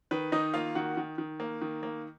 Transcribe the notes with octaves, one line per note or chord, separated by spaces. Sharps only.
D#3 B4
D#3 D#4 D#5
A#3 F4 F5
D#3 F#4 F#5
D#3
D#3
A#3
D#3
A#3